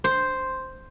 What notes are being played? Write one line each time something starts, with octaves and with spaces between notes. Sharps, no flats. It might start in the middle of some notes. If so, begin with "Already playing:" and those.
C5